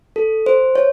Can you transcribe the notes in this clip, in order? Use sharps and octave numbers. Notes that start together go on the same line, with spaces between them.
A4
C5
C#5